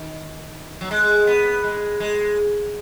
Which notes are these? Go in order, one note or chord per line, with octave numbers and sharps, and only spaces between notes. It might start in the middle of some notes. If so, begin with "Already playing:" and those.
Already playing: D#3
F#3
G#3
B3
G#3
G#3